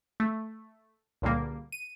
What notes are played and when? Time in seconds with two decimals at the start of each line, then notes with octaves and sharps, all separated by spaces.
0.20 A3
1.22 C#2 A#2 D3 G3 A#3
1.72 D#7